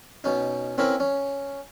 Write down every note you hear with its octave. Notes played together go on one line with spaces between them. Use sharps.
B2 C#4 D#4
C4 C#4 E4 A#4 B4
C#4